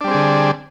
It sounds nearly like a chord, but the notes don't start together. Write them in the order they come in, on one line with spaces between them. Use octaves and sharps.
D4 G3 C4 G#4 D3